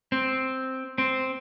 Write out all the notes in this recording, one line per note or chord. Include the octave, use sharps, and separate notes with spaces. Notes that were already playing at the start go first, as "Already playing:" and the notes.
C4
C4